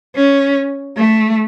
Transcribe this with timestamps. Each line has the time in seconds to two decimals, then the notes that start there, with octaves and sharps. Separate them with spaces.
0.16 C#4
0.97 A3